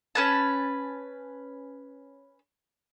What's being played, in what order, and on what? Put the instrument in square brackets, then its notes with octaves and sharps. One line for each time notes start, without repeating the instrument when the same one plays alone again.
[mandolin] C#4 B4 A5